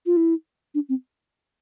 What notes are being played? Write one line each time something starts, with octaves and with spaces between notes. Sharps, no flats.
F4
E4
D4
C4